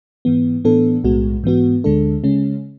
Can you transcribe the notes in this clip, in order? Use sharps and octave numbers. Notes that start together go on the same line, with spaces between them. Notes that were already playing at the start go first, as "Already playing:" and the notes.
G#2 E3 B3
A2 E3 B3 D4 A4
B1 A2 G#3 B3 F#4
G#2 E3 B3 F#4
D2 D3 G#3 D4 A4
C#3 G#3 C#4